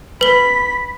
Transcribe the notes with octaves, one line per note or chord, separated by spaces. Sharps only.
B4 B5 B6 G7